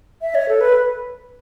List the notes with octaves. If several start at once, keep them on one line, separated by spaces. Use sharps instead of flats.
E5
C#5
A4
B4